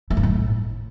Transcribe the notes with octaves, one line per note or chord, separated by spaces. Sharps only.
A3
G2
A2